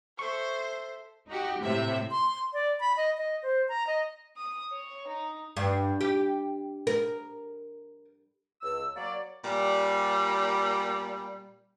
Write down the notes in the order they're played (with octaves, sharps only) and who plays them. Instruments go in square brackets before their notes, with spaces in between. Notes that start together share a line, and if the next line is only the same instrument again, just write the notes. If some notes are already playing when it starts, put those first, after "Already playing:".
[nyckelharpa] A4 E5 [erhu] C5 [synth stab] C#6
[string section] D#4 F#4 G4
A2 C3 E5
[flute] C6
D5
B5
D#5
D#5
C5
A#5
D#5
[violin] D#6
C#5
D#4
[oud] G2
G4
A#4
[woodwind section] C#2 E6
F#3 A#3 C#5 D5
[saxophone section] A#2 G3